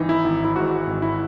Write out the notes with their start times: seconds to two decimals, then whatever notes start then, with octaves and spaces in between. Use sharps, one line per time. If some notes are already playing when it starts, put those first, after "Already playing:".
Already playing: G#1 E3 D#4
0.09 E4
0.24 G#1
0.45 E4
0.56 G#2 F#4
0.87 G#1
1.02 E4